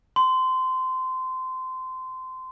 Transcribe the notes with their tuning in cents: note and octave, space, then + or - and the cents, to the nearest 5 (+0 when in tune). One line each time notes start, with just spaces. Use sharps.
C6 -20